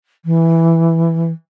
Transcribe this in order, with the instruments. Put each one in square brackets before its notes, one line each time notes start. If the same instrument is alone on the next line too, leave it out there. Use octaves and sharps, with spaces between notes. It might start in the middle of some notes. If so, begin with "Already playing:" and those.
[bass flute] E3